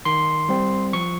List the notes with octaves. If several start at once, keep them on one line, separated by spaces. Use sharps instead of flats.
D#3 C6
G3 C4
F3 C#6